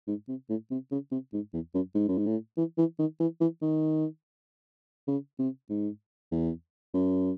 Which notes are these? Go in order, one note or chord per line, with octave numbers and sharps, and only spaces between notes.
G#2
C3
A2
C3
C#3
C3
G#2
E2
F#2
G#2
F#2
G#2
A2
E3
E3
D#3
E3
E3
D#3
C#3
C3
G#2
E2
F#2